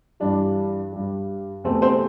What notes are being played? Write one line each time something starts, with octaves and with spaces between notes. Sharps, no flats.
G2 E3 G3 D4
G2 G3
E2 C3 A3 C4
C4 C5